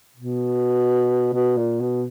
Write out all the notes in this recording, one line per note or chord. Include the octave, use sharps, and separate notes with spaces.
B2
B2
A#2
B2